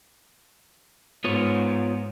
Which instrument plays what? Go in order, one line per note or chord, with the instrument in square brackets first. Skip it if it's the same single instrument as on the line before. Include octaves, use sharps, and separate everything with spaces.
[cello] G#2 [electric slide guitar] B3 F4 C#5